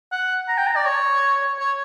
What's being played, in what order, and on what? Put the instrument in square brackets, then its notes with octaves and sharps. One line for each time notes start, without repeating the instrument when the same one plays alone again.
[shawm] F#5
A#5
G5
A#5
D5
C#5
C#5